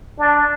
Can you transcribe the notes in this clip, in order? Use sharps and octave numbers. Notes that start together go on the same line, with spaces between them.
D4